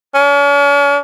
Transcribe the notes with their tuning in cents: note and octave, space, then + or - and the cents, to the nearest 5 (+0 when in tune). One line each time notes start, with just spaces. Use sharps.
C#4 +45